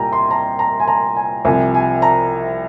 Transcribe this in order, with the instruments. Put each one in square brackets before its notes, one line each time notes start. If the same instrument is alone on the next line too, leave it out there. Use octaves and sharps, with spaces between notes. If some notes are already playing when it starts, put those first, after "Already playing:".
Already playing: [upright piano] C2 A#2 G3 G5 G#5 A#5
C6
A#5
A#5
G#5
A#5
G#5
C2 C3 F3 G#5
G#5
A#5